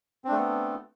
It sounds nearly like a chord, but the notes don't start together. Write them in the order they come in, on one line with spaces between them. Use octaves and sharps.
C4 D4 A3 A4 B3